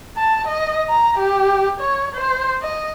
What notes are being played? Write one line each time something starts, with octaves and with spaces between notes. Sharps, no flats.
A5
D#5
A#5
G4
C#5
C5
D#5